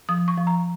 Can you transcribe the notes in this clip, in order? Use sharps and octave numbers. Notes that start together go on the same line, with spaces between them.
F3 D#6
C#6
F3
A#5